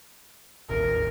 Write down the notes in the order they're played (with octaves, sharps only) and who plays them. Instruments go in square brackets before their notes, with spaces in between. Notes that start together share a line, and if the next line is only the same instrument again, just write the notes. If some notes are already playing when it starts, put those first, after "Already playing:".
[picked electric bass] E1 A1 D#2 [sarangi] A#4